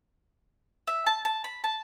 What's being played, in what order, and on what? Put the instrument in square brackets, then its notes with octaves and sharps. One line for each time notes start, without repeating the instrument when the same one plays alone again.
[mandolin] E5
A5
A5
B5
A5